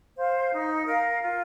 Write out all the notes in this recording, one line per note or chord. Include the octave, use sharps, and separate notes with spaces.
C5 F5
D#4
A#4 F5
F4